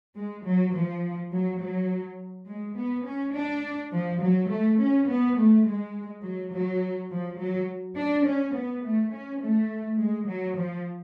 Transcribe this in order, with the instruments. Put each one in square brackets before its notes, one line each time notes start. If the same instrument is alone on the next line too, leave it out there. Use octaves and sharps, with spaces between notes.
[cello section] G#3
F#3
F3
F#3
F#3
G#3
B3
C#4
D4
F3
F#3
A3
C#4
B3
A3
G#3
F#3
F#3
F3
F#3
D4
C#4
B3
A3
C#4
A3
G#3
F#3
F3